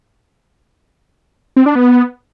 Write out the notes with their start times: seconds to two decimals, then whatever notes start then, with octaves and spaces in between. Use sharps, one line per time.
1.56 C4
1.66 D4
1.75 B3